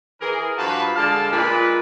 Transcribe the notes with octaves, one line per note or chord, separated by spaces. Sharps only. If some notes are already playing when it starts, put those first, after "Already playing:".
E3 G#4 A#4
G2 F3 F#4 B4 F5 A5
D3 G#3 F5 A5
A#2 G#3 B4